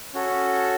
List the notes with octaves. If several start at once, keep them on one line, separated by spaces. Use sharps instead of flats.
C#4 F#4 A4